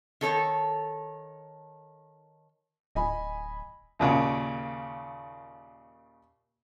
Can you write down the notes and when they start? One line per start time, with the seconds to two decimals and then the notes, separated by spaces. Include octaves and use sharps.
0.21 D#3 A4 C#5 A5
2.95 D1 D#5 G#5 B5
3.99 D#2 A#2 C#3